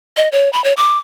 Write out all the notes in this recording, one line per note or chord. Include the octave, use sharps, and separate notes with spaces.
D#5
C#5
B5
C#5
D6